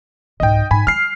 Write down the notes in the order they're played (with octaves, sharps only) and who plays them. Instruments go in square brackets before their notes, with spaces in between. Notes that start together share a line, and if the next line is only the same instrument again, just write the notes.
[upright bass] C2 G#2 [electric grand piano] D#5 G5
[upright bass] G#2 [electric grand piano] G#5 B5
[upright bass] G3 [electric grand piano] F6 C7